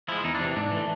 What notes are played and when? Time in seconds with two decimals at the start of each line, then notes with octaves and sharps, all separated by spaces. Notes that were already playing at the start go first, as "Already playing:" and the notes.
0.08 F3 G#3 E4
0.24 E2 D#4
0.35 D4
0.40 C3 E3
0.56 G#2 D4
0.71 E3 A3